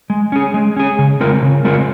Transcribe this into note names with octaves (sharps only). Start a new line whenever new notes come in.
G#3
C#4 G#4
G#3
C#4 G#4
C#3
G#3 C4 F4 A#4
C#3
G#3 C4 F4 A#4